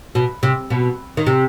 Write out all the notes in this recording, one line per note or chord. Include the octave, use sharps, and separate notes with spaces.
B2
C3
B2
D#3
C3